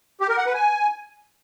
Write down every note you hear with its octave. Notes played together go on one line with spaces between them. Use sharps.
G4
A#4
F#5
B4
G#5